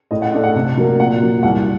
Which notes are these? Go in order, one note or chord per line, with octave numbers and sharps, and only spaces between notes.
A2 D#5
F#5
A3 D4 D#5
F#5
C3
F#3 A#3 D4
A#2 F#5
F#3 A#3
C2 F#5